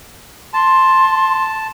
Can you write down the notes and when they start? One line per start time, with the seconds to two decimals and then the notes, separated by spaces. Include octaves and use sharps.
0.53 A5 C6